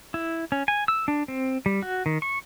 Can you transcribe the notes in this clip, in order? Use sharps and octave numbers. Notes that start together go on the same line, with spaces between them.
E4
C#4
G#5
E6
D4
C4
G3
F#4
D#3
C#6